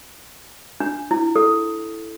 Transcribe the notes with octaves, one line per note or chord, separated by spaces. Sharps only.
D4
E4
A4